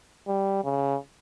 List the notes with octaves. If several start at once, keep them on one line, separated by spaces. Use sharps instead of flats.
G3
C#3